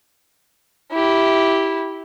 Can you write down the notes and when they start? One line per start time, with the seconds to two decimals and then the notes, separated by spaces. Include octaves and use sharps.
0.92 E4 G4